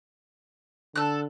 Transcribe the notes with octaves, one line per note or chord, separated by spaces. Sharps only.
D3 A4 F#6